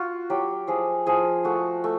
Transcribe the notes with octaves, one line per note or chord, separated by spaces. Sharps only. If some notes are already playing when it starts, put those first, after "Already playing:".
Already playing: F4 F#4
F#3 G4
F3 G#4
F3 G#4
A3 F#4
A3